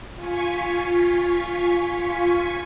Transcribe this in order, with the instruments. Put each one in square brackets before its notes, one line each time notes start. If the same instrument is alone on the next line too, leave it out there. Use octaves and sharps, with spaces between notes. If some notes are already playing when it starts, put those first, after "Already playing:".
[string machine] F4 G#5 C#6 B6